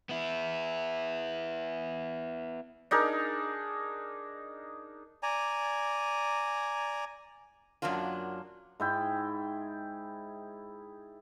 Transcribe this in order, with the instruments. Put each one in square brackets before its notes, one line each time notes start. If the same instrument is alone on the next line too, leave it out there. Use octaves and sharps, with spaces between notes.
[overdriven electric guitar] B3 E4
[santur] D4 D#4 G#4 A#4
[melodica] D5 G#5 A#5
[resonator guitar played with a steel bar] F#2 F#3 A#3 D4 F4
[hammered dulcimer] G#2 E4 G5